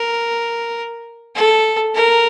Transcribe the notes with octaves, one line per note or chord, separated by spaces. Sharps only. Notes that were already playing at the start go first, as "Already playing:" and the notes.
Already playing: A#4
A4
A#4